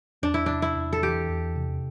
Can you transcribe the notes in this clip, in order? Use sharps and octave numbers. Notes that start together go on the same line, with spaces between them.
E2 D4
E4
C3 D4
E4
E2
A4
E3 G4
E2
C3